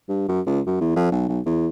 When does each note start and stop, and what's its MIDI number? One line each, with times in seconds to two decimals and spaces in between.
0.09 0.28 43
0.29 0.40 42
0.46 0.60 37
0.66 0.76 42
0.81 0.92 40
0.96 1.10 41
1.12 1.25 35
1.29 1.40 35
1.46 1.68 40